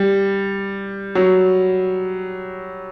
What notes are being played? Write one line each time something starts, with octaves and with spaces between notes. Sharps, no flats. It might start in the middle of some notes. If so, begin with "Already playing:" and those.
Already playing: G3
F#3